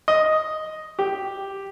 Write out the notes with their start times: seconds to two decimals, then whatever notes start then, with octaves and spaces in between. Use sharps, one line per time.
0.08 D#5
0.99 G4